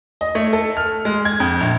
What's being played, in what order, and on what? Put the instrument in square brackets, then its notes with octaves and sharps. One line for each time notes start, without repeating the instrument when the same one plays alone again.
[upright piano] D#5
A3
A4
F6
G#3
G#6
F2
A#1